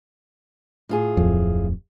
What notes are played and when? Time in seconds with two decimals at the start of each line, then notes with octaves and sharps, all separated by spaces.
0.89 A2 F4 G#4
1.17 D1 F2